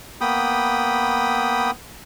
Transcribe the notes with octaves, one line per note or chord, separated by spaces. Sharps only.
A#3 B3 G5 B5 D#6